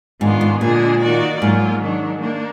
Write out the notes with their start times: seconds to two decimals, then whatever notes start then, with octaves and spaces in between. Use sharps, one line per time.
0.21 G#2 D#3 G#3 B3 D4 F4
0.41 G#2
0.61 A#2 D3 G#3 D4 G#4
1.01 D#3 A#3 D#4 F#4 D5
1.41 G#2 F#3 A#3 F4
1.82 D#3 F#3 D4
2.21 A#3 D4